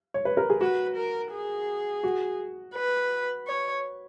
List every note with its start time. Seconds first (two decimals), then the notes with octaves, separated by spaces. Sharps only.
0.14 C#5
0.25 B4
0.37 A#4
0.50 G#4
0.61 F#4 B4
0.96 A#4
1.33 G#4
2.03 F#4
2.76 B4
3.47 C#5